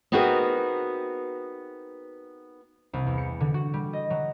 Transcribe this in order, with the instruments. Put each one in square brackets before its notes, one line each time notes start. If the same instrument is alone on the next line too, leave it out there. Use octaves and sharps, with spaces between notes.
[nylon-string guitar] B3 C4 D#4 F#4 G#4 A#4
[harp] C2
E2
C#7
D3
F#4
G3
D#5
F#3